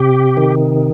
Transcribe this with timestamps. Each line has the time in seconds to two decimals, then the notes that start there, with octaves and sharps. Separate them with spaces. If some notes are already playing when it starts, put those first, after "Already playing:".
Already playing: C3 G4
0.37 D#3